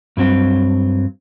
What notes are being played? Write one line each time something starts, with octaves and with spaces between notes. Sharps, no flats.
G2 F#3 C4